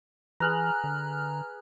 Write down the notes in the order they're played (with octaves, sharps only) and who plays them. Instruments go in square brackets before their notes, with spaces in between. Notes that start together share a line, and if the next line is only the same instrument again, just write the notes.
[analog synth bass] E3 [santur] G#4 B4 [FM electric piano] A#5 F6 F#6
[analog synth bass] D3